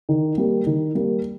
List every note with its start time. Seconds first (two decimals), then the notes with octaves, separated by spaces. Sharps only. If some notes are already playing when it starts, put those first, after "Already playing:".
0.09 D#3
0.38 G3 A#3
0.66 D#3
0.95 G3 A#3